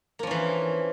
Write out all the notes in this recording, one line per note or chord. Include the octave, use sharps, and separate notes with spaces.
E3 F3 A#3 C#4